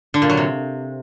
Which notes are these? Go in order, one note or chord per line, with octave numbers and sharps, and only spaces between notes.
D3
A#2
F#3
C3